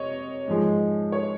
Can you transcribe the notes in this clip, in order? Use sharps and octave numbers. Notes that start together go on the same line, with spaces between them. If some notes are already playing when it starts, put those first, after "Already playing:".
Already playing: C3 C#5 D#5
G#2 F3 G#3
C#5